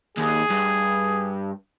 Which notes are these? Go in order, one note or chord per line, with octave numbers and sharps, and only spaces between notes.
D#2 G#4
G2